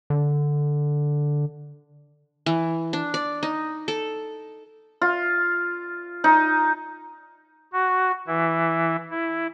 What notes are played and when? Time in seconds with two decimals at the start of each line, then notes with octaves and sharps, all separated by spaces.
0.10 D3
2.46 E3
2.93 D4
3.14 D5
3.43 D#4
3.88 A4
5.01 F4
6.24 D#4
7.73 F#4
8.28 E3 E4
9.11 E4